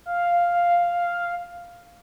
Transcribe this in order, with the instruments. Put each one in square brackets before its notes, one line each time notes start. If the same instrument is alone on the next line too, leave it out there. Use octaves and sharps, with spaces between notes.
[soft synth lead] F5